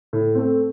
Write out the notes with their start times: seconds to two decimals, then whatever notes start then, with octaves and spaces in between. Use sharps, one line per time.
0.13 A2
0.35 A3 C4